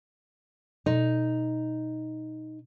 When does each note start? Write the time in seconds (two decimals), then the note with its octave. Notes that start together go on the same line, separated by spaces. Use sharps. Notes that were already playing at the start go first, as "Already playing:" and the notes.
0.86 B2 D#4